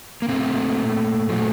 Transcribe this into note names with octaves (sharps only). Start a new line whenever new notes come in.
A#3
A#2 A3 C4
A#2 F#3 A3